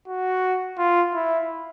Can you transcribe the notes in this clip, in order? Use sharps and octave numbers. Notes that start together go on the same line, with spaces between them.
F#4
F4
E4